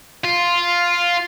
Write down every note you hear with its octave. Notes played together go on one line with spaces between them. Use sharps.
F4